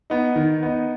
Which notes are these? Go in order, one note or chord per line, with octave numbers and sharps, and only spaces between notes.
B3 D#4
D#3
B3 D#4